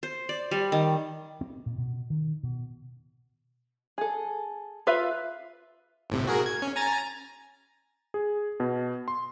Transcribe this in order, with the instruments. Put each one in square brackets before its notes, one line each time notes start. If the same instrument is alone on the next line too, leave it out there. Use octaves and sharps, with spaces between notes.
[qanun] C5
D5
G3
D#3
[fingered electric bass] C4
A#2
B2
D#3
B2
[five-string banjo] G#4 A4
F4 B4 E5 F5
[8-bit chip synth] G1 A2 C3
F#4 G#4 A#4
G#6
C#4
G#5 A#5 A6
[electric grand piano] G#4
B2
C6